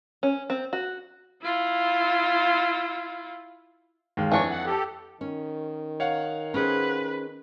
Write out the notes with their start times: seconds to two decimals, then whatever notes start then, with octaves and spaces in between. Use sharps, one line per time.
0.23 C#4
0.50 C4
0.73 F#4
1.42 E4 F4
4.17 D#2 G#3 F5
4.32 F2 E3 D4 C#5 C#6
4.51 F#5
4.65 G4 A4
5.21 D#3 C#4
6.00 C#5 F5 F#5
6.54 C#4 G#4 B4 C5